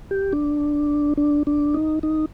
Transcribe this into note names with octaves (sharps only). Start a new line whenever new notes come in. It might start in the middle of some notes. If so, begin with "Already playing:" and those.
G4
D4
D4
D4
D#4
D#4